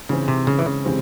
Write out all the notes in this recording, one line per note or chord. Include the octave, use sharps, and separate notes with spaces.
G#2 C#3 E3 G#3 C4
C3
C#3
E3
C#3
C3 E3 G#3 C4